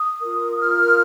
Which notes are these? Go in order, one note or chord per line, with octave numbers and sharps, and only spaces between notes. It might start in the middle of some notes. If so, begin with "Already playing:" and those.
Already playing: D#6
F4 A#4
F6